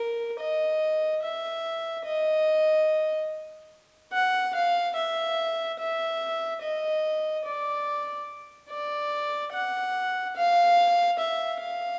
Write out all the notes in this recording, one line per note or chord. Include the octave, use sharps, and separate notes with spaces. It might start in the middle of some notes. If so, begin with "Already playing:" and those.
Already playing: A#4
D#5
E5
D#5
F#5
F5
E5
E5
D#5
D5
D5
F#5
F5
E5
F5